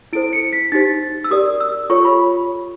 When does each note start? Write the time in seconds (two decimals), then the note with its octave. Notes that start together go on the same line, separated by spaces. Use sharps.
0.13 E4 A4 C5 D7
0.33 C#7
0.53 B6
0.72 D#4 G4 C5 A6
1.24 E6
1.31 G4 A#4 D5 D#6
1.61 E6
1.90 F4 A4 C#5 C#6
2.05 B5